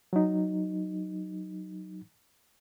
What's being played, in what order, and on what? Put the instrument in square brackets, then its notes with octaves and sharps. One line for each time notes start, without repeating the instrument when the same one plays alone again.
[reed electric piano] F#3 D#4